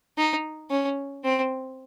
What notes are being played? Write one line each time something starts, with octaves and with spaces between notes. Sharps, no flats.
D#4
C#4
C4